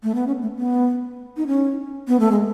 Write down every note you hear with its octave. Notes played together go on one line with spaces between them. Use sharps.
A3
B3
C#4
A3
B3
D#4
C#4
B3
A3
G#3